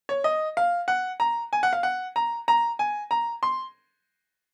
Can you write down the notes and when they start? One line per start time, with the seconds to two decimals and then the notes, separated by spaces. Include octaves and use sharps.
0.09 C#5
0.24 D#5
0.57 F5
0.88 F#5
1.20 A#5
1.53 G#5
1.63 F#5
1.73 F5
1.83 F#5
2.16 A#5
2.48 A#5
2.79 G#5
3.11 A#5
3.43 C6